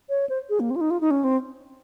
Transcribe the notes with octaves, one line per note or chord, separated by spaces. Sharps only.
C#5
C5
G#4
A#3
C4
F4
D#4
F4
D#4
C#4
C4